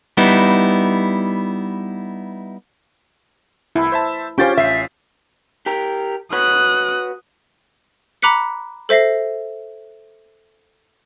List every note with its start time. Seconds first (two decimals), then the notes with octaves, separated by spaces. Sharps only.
0.17 G3 B3 D#4 E4
3.75 C2 E4
3.92 C5 E5 A5
4.38 C#4 F4 G4 C5 C#6 G6 A6
4.57 A1 E5 C7
5.66 G4 A#4
6.33 F#4 B4 C#5 D#6 F#6
8.22 A#5 B5 D6 F#6 B6 C#7
8.89 A4 C5 E5 A#6 C7